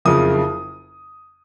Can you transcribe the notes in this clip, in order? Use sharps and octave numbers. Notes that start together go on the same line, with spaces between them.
F#1 F2 C#3 D#6